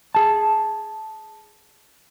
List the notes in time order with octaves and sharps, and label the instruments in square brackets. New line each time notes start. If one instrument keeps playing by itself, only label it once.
[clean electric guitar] G#4 A5